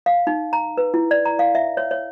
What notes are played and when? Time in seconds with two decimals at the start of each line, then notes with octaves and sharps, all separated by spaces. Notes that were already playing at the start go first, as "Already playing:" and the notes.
0.06 F5
0.27 D#4
0.53 A#5
0.78 B4
0.94 E4
1.11 D5
1.25 A#5
1.39 F5
1.55 E5
1.77 C#5
1.91 C#5